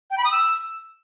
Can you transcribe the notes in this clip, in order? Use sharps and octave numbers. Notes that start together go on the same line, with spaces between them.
G5
B5
D#6
E6